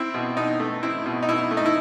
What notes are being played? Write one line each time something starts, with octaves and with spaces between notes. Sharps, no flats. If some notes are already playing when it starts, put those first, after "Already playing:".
Already playing: C4 E4
B2
B2 D#4
A3
C4 E4
B2
D#4
B2 E4
A3
D#4
E4